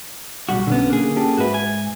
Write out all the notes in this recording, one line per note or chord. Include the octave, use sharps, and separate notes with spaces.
B1 G3 F#4
B1 D3 B3 C#4
A#3 G#4
C#4 G4 A4
G#2 F#4 B4 E5
G#5